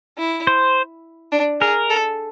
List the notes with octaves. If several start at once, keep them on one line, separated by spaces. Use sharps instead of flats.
E4
C5
D4
G#4 A#4
A4